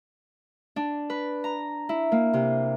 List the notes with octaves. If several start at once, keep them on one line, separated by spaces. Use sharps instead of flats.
D4
B4
A#5
E4
A#3
C3